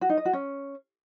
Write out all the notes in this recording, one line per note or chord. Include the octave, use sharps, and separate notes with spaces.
F#4
D#4
D#5
F#4
C#4